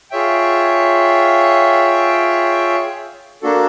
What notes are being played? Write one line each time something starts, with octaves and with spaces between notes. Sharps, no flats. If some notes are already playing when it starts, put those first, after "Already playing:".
F4 G#4 C#5 E5 G5
A#3 D4 F#4 A4